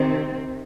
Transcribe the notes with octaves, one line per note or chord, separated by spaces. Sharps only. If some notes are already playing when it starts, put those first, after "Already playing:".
Already playing: C3 D#3 C4